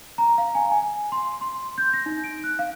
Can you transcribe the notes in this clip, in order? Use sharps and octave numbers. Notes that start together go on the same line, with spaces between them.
A#5
F5
G#5
G#5
C6
C6
G6
A#6
D#4
D7
F#6
F5